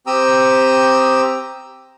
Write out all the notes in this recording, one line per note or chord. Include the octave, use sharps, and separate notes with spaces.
C4 G4 G5 A#5 D#6 E6